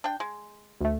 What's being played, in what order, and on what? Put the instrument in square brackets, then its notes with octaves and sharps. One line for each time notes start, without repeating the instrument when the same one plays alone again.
[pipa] D4 G5
G#3
[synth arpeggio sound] D2 A3